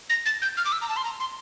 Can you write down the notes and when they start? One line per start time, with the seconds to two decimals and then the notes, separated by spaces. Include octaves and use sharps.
0.10 A#6
0.26 A6
0.42 G6
0.57 F6
0.65 D6
0.72 E6
0.81 A#5
0.89 A5
0.97 C6
1.04 A#5
1.20 C6